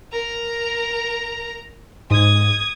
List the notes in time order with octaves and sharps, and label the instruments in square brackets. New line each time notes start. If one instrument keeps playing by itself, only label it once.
[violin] A#4 A#5
[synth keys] G#2 [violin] D#6 G#6